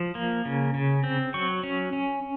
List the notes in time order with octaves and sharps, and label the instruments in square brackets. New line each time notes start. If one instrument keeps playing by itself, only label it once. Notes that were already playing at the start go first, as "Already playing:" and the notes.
Already playing: [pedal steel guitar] F3
A#3
C#3
C#3
C4
F#3 C#6
C#4
C#4